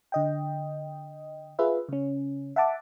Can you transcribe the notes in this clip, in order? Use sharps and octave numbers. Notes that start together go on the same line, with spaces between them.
D3 D#5 G5
F4 G#4 B4 E5
C#3 C#4
E5 F#5 A5 D6